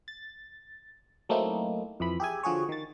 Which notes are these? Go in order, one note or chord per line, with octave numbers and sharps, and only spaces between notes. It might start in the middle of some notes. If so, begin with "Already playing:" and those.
A6
F#3 A3 A#3 C4 D#4 E4
F2 E3 B5
G4 G#4 E5 G#5
D3 F3 F#4 G#4 C#5
D#3 A6